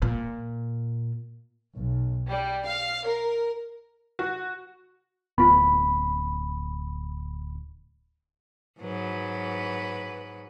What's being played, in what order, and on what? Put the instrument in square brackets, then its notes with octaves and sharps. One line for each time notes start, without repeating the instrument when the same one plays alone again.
[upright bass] A#2
[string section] B1
G3
F5
A#4
[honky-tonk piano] F#4
[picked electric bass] D1 [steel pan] B3 F4 [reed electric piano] B5
[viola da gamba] G#2 F#3 B4